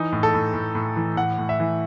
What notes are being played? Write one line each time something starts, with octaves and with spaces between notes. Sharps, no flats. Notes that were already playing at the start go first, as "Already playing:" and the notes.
Already playing: E3 D#4
A2
A4
A2
A2
A2
E3
A2 F#5
A2
E5
E3